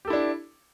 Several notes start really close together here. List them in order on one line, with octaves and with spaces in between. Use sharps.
G4 A4 E4 D4